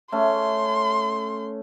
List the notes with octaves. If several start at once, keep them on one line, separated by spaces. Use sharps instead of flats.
A3 C#4 C6